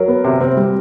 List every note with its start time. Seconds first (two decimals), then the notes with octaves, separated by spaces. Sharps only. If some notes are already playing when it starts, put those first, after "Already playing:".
Already playing: F#3 A#4
0.08 B3
0.25 C3
0.41 C4
0.57 G3